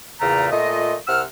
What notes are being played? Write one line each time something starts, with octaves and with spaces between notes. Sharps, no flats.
E2 A#2 C#3 A3 A#4 A#5
A#2 A3 F4 D#5
C2 C3 F#5 E6 F6